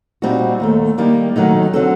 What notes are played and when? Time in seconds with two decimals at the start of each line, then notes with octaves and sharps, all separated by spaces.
0.22 A#2 G3 C4 D#4 F#4
0.60 D#2 D#3 A3
0.98 D#3 G3 A#3 D#4 G4
1.36 D#2 D#3 F#3 A3 D#4
1.73 D3 F#3 C4 F#4 A4